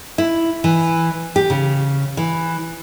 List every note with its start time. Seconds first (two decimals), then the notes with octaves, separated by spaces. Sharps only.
0.18 E4
0.64 E3
1.36 G4
1.50 C#3
2.17 E3